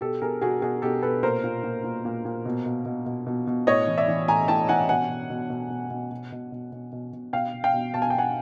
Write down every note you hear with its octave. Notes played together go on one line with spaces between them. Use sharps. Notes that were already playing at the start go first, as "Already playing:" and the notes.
B2 G4 A4
B2 G#4 A#4
B2 F#4 G#4
B2 F#4 G#4
B2 G4 A4
B2 A4 B4
A#2 A#4 C5
A#2
A#2
A#2
A#2
A#2
B2
B2
B2
B2
B2
B2
A2 C#5 D#5
E3
D5 E5
E3
A2 G#5 A#5
A2 G5 A5
E3 F#5 G#5
B2 F#5 G#5
B2
B2
B2
B2
B2
B2
B2
B2
B2
B2
B2
B2 F5 G5
B2
F5 G5
B2
B2 A5
G#5
G5
B2 F#5 G#5